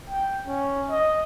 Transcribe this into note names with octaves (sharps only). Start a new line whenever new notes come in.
G5
C#4
D#5